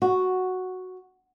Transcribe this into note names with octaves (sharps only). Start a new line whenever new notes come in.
F#4